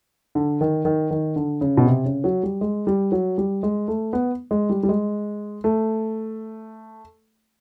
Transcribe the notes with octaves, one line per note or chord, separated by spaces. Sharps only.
D3
D#3
D#3
D#3
D3
C#3
B2
C3
C#3
F#3
G3
G#3
G3
F#3
G3
G#3
A3
B3
G#3
G3
G3
G#3
A3